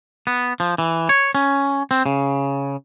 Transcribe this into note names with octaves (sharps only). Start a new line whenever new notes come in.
B3
F3
E3
C#5
C#4
C4
C#3